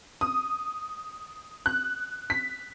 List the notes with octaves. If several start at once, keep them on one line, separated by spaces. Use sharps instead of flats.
D#6
F#6
B6